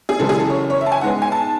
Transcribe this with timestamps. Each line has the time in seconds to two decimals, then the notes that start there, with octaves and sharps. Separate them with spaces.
0.09 G#4
0.19 F#2 C#3 E3 G#3 A4
0.29 G#4
0.39 A4
0.50 C#5
0.70 C#5
0.81 E5
0.86 A5
0.92 G#5
1.01 G#2 G#3 B3 F#5
1.22 G#5
1.32 A5